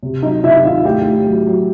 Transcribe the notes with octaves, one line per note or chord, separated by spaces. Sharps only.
C3
F#3 D#4 D#5
C3 E4 E5
D#3 F4 F5
A2 G4 G5
A2
F#3
F#3